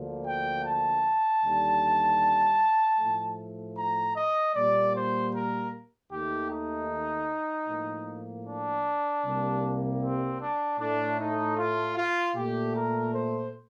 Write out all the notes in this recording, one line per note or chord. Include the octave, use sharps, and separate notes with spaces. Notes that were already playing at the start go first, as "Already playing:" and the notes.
Already playing: D2 D3 F3 A#3
G5
A5
D#2 D3 G3
A2 F3 A3
A#5
D#5
A#2 G3 A#3 D5
C5
A#4
D#2 D#3 A3 G4
D#4
A2 F3 A#3
D4
C2 C3 G3 A#3
C4
D4
A2 A3 D4
D#4
F4
F4
A#2 A3 G4
A#4
C5